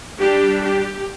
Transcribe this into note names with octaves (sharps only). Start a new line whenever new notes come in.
G3 D4 G4
G4